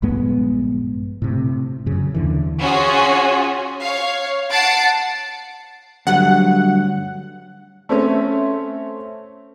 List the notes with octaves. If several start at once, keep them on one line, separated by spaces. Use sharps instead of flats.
A#1 G2 G#3 B3
A2 C3
F#2 C#3
D#2 D3 E3
C#4 F4 F#4 G#4
C#5 F5
F#5 A5 A6 C7 D7
D2 G2 F#3 F#5
A3 C4 C#4